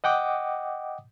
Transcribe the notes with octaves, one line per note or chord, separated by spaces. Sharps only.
D#5 F#5 G5 D6 D#6